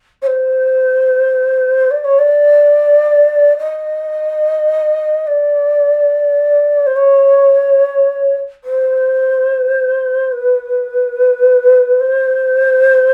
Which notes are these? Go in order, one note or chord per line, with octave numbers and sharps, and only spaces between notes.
C#5
C5
D5
C#5
D5
D#5
D5
C5
C#5
C5
B4
C5